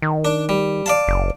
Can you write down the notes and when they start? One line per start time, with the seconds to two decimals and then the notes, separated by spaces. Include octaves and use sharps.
0.02 D#3
0.25 D4
0.49 G3
0.86 D5 F5 A5
1.08 F#1